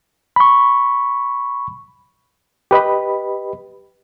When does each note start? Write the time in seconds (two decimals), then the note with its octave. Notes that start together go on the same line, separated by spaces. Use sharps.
0.36 B5 C#6
2.71 G4 B4 D#5 B5